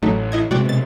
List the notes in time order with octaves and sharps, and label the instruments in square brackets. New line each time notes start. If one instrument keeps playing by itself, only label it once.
[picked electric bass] A1 [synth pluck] F#3 A3 D#4
[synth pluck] E4 D#5 G#6
[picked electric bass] C3 G#3 C4 [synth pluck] F#4 D5 G5
[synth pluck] B2 A6